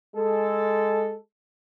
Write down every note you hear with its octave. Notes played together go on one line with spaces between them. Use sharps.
G#3 A4